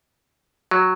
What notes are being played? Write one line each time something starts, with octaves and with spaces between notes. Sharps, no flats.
F#3